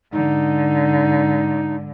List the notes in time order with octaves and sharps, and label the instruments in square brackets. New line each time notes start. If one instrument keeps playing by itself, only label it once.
[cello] G#2 D3 [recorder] D#4